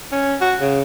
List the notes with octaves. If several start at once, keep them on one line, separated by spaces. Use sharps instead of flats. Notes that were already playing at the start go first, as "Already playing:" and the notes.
C#4
F#4
C#3